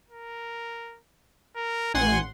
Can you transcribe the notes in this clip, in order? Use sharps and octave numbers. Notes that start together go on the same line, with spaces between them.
A#4
A#4
A1 F#5 G#5 C6